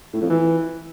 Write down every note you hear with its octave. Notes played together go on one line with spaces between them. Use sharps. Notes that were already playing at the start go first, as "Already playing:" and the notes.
A2
F2
E3